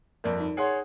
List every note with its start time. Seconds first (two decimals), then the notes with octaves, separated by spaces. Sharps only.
0.24 G1 F2 A#4 D5
0.40 D#4
0.57 G#4 C#5 F#5 C6